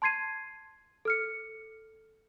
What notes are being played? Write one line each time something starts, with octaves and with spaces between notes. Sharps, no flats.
A5 C6 G#6 C7 D#7
A4 F6 C#7